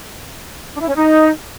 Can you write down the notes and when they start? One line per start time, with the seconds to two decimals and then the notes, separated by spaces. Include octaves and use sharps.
0.73 D4
0.81 E4
0.88 C#4
0.95 D#4